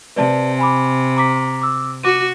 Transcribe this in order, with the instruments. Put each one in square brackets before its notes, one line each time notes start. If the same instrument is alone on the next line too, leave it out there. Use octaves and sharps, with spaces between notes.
[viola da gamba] C3 [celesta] B4 D5 A5
[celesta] G#5 B5 D6
A#5 D6 B6
D6 E6
[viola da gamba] F#4 [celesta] D6 D#7